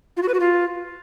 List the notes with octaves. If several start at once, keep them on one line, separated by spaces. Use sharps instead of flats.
F4
F#4
B4
F#4
F4